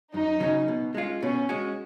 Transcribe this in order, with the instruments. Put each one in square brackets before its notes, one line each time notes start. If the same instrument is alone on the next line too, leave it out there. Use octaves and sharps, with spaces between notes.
[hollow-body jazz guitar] F#2 [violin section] D#4
[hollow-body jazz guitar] C#3 F#3 C#4
B2
G#3 C#4 F4
[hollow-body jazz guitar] B2 [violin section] C#4
[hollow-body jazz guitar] G#3 C#4 F#4